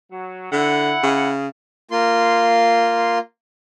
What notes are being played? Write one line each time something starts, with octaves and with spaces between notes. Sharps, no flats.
F#3
D3 E4 F#5
C#3
A#3 F4 C6